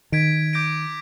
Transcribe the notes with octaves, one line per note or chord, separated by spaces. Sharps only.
D#3 G#6 B6 D7
D6 G6 A#6 D7